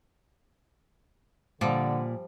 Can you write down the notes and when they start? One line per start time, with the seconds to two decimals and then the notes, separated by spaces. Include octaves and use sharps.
1.61 A#2 D3 F3 G3